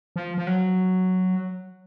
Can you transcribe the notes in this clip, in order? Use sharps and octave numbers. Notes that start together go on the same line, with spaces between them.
F3
F3
F#3